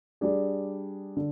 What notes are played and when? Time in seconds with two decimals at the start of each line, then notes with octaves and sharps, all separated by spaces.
0.21 G3 D4 G#4
1.17 D3